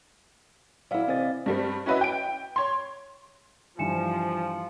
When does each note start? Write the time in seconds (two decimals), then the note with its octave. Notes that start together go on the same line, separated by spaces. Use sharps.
0.91 F#3 E4 D5 F5
1.08 C3 E3 C4 D#5 A6
1.46 G2 G3 C4
1.86 C#4 E4 F#4 B4 D#5 E5
2.01 G5 D7
2.56 C#5 C6
3.79 G2 E3 F3 G3 G#5 C#7 E7